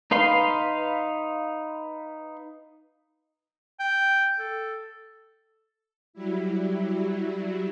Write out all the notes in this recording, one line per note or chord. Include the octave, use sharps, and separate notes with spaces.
D#4 B4 F5 C6
G5
A4
F#3 G3 E4